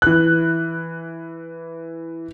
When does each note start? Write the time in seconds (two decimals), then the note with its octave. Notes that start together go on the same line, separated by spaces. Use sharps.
0.02 E3 F#6